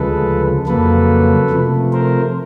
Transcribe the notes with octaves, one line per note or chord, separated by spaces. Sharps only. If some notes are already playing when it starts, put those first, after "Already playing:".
Already playing: D2 C#3 F3 G#3 A4 B4
F2 C#3 F#3 A#3 A4 B4
C3 F3 A3
A#4 C5